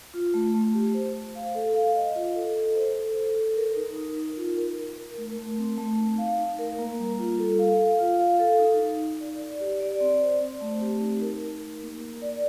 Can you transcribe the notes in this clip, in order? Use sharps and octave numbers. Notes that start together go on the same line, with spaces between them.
F4
A3
A3
G4
C5
C5
F5
A4
F5
D#5
F4
A4
A4
C5
A4
A4
A4
A#4
D#4
D#4
D#4
F4
A#4
A#4
A#4
A3
A3
C4
A3
D#4
F5
D#4
A#4
A#3
G3
F4
A4
F5
F5
F4
F5
A4
D#4
D#4
D#4
D5
D5
G4
D5
C4
C5
C4
A3
G4
D#4
A#4
D#4
A#4
A#3
A#4
D5